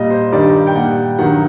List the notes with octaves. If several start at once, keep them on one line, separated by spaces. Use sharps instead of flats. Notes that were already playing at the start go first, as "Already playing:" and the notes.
Already playing: A#2 G3 D#5
C5
G2 D#3 G3 D5
G5
A#2 G3 F#5
G2 D#3 F#3 F#5